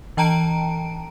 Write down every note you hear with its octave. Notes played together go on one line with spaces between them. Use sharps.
E3 G5 A5 A#5 D7